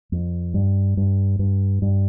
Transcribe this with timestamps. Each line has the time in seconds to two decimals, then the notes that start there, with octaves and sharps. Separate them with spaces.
0.12 F2
0.54 G2
0.97 G2
1.39 G2
1.82 G2